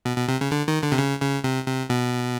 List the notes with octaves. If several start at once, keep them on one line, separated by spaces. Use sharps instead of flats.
B2
B2
C3
C#3
D3
D#3
D3
C3
C#3
C#3
C3
C3
B2